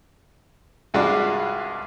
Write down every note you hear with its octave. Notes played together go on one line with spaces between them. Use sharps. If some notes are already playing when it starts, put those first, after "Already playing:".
C2 G2 G#3 F4 F#4 D5